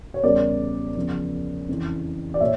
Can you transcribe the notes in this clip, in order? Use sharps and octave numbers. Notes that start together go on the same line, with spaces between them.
C#5
E2 C#3 G3 A#4 D5
E2 C#3 F3
F2 C#3 E3
D5
A#2 C#5 E5